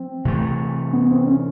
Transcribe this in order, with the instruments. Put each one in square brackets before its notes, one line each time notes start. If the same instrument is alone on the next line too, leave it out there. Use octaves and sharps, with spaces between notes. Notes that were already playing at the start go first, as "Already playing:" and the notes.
Already playing: [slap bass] F3 [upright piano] C4
[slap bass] C3 E3 A3
[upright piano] B3
C4
C#4